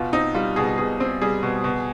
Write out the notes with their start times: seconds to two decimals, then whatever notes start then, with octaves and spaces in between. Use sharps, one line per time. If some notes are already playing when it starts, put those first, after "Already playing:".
Already playing: B2 F4
0.13 C4 D#4
0.34 G3 F4
0.56 B2 G#4
0.78 B2 G#4
1.00 C4
1.22 G3 G#4
1.43 B2
1.64 B2